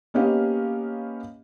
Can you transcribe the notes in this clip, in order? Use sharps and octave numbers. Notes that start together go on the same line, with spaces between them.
A#3 B3 C#4 G4 D#5 F5